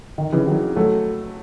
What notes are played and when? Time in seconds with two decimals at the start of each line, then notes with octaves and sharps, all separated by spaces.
0.18 D#3
0.33 C#3 E3
0.47 D#3 F#3
0.76 F#3 A3